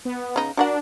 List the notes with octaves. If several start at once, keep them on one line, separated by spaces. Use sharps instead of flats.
B3
C#3 D#4
D4 F#4 A#4 F#5